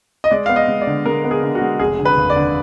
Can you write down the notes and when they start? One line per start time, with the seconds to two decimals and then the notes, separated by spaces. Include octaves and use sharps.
0.24 D#5
0.31 G#3 D5
0.46 B3 F5
0.56 D#5
0.68 G#3
0.81 D5
0.87 D3
1.06 G#3 A#4
1.24 B3
1.31 G#4
1.43 D3
1.55 F#4
1.62 G#3
1.80 F1 G#4
1.99 D3
2.05 B4
2.17 D#2
2.30 D5
2.36 D3